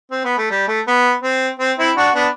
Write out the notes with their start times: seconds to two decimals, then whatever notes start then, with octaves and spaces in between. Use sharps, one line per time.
0.11 C4
0.24 B3
0.37 A3
0.50 G3
0.68 A3
0.87 B3
1.23 C4
1.59 C4
1.78 C4 E4
1.96 D4 F#4
2.14 B3 D4